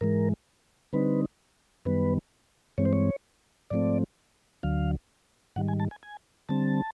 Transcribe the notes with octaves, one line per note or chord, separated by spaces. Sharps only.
G#2 E3 G#3 A#4
D3 G3 C4 D#4 B4
F#2 D#3 G3 B3 B4
G2 E3 G#3 C4 C#5
C5
C#5
G#2 F3 A3 C4 D5
D2 D3 F#3 F5
G#2 D#3 G3 F#5
G#5
A5
G#5
G#5
D3 G3 C4 A5